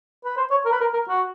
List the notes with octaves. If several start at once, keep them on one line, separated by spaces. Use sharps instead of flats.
B4
C5
C#5
A#4
B4
A#4
A#4
F#4